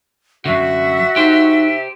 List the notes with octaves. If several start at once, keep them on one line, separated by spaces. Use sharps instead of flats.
F#2 D3 F#4 E5
D#4 G4 C5